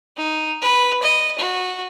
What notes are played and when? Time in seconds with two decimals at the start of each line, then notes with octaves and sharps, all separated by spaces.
0.17 D#4
0.62 B4
1.02 D#5
1.38 F#4